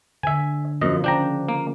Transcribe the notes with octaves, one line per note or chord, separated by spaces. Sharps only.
D3 E5 G#5
F#2 F3 A#3 D#5
C#3 D4 G5 A#5
A#3